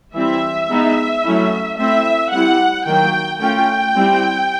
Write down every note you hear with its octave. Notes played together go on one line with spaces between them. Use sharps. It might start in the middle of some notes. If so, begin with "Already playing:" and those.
E3 G3 C4 E4 E5
G#3 B3 D#4
F#3 A3 C#4 E4
A3 C4 E4 E5
G3 C4 E4 F#5
D#3 F#3 A#3 G5
A3 C#4 F4 G5
G3 C4 E4